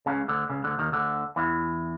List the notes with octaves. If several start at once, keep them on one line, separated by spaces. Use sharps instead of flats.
C#2 C#3
D2 D3
C#2 C#3
D2 D3
D#2 D#3
D2 D3
E2 E3